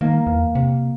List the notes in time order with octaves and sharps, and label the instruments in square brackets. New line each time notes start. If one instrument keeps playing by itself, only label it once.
[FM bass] D#3 [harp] A#3
[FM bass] E2
C3